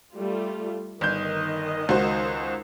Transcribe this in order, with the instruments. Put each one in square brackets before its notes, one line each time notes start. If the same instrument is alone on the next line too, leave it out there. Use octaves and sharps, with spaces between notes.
[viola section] G3 A3 F4
[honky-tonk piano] G1 G6 [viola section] D#3 D#5
[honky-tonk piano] C#2 F#4 C5